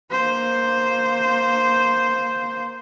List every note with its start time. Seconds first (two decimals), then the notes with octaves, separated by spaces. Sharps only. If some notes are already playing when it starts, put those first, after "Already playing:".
0.11 A#3 C5